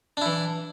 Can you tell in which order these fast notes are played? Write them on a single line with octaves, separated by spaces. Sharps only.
D4 E4 E3